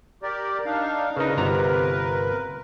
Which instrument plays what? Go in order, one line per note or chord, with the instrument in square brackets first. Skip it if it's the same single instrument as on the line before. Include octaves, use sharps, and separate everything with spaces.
[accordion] G4 A#4 D5
D4 D#4 F5
[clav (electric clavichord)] C#3 D#4 [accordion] A#4 B4
[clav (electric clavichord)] G1 C3 A#5